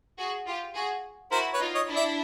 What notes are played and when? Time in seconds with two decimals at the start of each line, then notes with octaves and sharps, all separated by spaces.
0.18 F#4 G#4
0.46 F4 G4
0.75 F#4 G#4
1.32 E4 F#4 A#4 C5
1.53 B4 C#5
1.60 D#4 F4
1.75 C#5 D#5
1.89 D4 E4
1.96 D5 E5